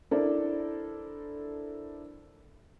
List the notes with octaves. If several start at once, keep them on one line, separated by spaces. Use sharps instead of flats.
D4 E4 A4 A#4 C5 D5